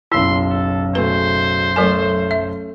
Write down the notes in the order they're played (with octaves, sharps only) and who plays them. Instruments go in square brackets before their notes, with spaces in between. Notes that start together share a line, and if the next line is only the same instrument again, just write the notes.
[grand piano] F#1 B1 E6 [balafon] E4 [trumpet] C6
[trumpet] A4
[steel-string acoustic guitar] B2 A3 G#4 [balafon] B4 [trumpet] C5
[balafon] F#3 A#4 G#5 [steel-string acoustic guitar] A3 C#4
[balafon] E5